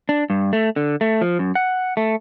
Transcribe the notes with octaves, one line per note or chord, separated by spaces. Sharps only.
D4
G2
A3
D3
A3
F3
F#2
F#5
A3